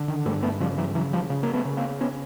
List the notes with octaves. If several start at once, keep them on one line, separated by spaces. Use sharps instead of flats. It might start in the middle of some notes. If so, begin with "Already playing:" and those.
Already playing: D3
D#3
G2 G3 A3
A3 B3
C#3 F3 G3
E3 F#3
C#3 E3 F#3
F3 G3
C#3
A#3
A3 B3
C#3
A#3 C4
B3 C#4